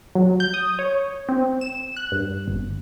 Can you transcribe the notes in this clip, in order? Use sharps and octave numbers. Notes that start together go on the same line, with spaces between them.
F#3
G6
D#6
C#5
C4
E7
F#6
G2
G1